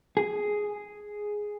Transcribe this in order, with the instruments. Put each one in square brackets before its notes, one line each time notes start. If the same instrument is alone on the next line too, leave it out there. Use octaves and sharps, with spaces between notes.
[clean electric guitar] G#4